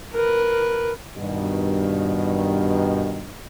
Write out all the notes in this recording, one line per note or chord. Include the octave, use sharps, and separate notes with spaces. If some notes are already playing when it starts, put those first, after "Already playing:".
A#4 B4
G2 B2 D#3